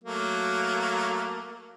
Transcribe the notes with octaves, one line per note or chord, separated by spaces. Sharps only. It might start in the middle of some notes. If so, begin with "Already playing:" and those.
F#3 A3 A#3